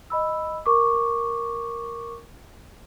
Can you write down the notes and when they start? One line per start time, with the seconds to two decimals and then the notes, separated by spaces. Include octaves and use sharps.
0.10 D#5 B5 E6
0.66 A#4 C#6 D6